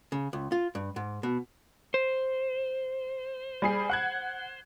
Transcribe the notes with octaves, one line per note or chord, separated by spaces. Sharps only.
C#3
C#2
F4
G2
G#2
B2
C5
G3 G#4 C7
F#5 F#6 G#6